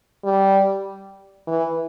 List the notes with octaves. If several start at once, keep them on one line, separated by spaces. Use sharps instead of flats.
G3
E3